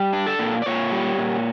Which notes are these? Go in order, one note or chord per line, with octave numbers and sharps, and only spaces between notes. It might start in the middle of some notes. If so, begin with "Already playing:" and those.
Already playing: G3
D4
A4
A#2
D5
A#2 C#5
G3
A#2